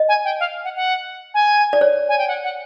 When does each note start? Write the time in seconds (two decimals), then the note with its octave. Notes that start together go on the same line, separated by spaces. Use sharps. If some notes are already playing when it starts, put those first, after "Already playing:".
Already playing: D#5
0.08 G#5
0.24 G5
0.40 F5
0.64 F#5
0.76 F#5
1.34 G#5
1.73 D5
1.81 C#5
2.09 G#5
2.18 G5
2.28 F#5
2.44 F#5